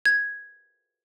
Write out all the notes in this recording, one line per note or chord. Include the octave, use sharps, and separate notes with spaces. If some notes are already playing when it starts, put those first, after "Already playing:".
G#6